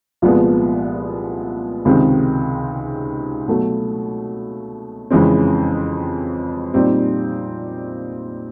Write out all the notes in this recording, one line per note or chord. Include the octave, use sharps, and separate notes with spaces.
C2 A#2 F3 G#3 B3
C#2 C3 D#3 G#3 C4
B2 F#3 A3
F2 C#3 E3 G#3 C4
A#2 G3 C4 D#4